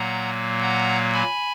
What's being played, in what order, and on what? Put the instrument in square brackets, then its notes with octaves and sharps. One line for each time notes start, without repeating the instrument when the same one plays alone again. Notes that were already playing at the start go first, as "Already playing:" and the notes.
Already playing: [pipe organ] A#2 F#3 A#3 F#5 A#5
F#5 A#5
G#5 B5